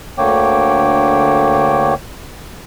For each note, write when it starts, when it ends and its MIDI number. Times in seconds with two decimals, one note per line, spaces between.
0.18 1.94 38
0.18 1.94 50
0.18 1.94 58
0.18 1.94 73
0.18 1.94 79
0.18 1.94 86